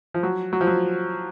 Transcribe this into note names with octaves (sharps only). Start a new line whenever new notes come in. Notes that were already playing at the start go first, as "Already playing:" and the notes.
F3
F#3
F#3
F3
F#3